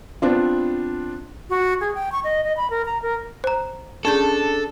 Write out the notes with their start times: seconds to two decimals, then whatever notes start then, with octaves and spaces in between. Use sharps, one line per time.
0.22 B3 C4 D4 F4
1.50 F#4
1.81 G#4
1.95 G5
2.12 C#6
2.24 D#5
2.44 D#5
2.57 B5
2.70 A#4
2.85 A#5
3.02 A#4
3.44 C5 A#5
4.05 C#4 D4 G#4 A4 A5 G6